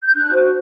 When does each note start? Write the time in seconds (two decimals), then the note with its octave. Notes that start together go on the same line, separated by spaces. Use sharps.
0.03 G6
0.15 D4 F#6
0.33 F#4 C5